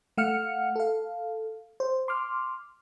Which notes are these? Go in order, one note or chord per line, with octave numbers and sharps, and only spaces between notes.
A3 F5 F#5 F6 C#7
A4 F5
C5
C6 D6 F6